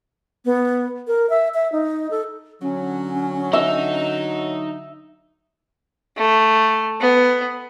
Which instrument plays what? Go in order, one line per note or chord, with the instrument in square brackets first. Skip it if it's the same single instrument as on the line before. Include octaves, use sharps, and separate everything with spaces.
[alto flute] B3
A#4
E5
E5
D#4
A4
[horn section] D3 F#3 [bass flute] C#4
[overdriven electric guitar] D#4 [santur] E5
[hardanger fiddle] A3
B3